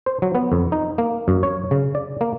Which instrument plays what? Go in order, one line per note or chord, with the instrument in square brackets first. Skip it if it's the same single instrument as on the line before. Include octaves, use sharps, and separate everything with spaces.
[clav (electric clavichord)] C5
F#3
B3
F2
D#4
A#3
F#2
C#5
C#3
D5
A#3